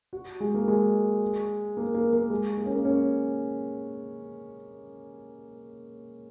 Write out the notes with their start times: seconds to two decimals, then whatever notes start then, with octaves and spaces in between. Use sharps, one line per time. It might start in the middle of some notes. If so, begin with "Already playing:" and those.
0.13 F#4
0.40 G#3
0.54 A#3
0.68 G#3
1.77 A#3
1.94 A#3
2.13 A#3
2.30 G#3
2.57 A#3
2.66 C#4
2.75 A#3
2.85 C#4